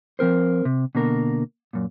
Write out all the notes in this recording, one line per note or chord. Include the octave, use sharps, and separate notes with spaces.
F3 C4 A#4 C5
C3
B2 D3 A#3 A#4
F#2 A#2